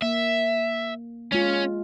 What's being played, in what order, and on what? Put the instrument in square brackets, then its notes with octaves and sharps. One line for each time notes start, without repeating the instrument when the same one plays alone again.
[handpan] A#3 [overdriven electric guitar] E5
[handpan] G#3 F4 [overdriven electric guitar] C#4